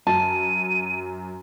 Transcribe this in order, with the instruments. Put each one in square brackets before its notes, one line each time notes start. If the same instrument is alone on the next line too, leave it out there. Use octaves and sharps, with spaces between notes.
[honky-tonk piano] F#2 [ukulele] A5 [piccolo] D#7